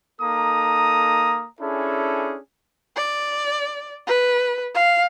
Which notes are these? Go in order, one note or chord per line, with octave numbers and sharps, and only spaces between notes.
A#3 D#4 A4 A#5 D#6
C#4 D4 E4 G#4 A4
D5
B4
F5